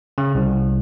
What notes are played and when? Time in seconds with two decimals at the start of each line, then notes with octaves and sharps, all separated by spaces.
0.18 C#3
0.35 C2